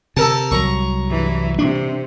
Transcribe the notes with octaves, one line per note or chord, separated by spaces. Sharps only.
C3 A4 A#4 A5
C2 F#3 A#5 C#6
G2 E3
C3 D4